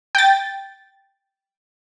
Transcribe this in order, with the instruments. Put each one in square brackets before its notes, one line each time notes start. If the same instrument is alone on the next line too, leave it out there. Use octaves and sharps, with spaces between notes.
[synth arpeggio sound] G5 A6